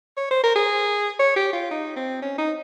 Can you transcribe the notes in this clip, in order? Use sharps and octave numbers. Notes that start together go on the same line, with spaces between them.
C#5
C5
A#4
G#4
C#5
G4
F4
D#4
C4
C#4
D#4